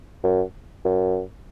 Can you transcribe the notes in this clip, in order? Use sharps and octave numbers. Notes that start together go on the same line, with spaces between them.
F#2
F#2